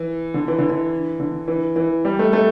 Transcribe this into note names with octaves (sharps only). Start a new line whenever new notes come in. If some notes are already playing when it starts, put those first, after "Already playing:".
Already playing: E3
D3
E3
D3
E3
D3
E3
E3
G3
A3
A3